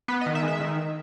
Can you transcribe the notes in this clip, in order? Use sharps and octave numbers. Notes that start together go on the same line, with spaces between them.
B3 B4
D#5
D#3
E5
G#3
E5
D#3